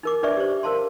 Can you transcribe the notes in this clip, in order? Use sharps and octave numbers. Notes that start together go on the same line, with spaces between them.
D#4 A#4 D6
D4 B4 D5 E5 C#6
G4 C5
A#4 C5 F5 A5 C6